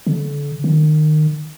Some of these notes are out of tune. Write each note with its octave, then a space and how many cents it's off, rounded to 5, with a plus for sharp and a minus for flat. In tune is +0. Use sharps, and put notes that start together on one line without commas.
D3 -35
D#3 -25